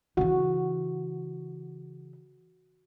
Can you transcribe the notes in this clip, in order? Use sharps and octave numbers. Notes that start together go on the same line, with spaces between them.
C#3 E3 F#4